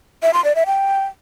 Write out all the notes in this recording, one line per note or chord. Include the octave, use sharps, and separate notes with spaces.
E5
C6
D5
E5
G5